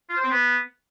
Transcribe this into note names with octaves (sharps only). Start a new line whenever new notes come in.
F4
C5
C4
B3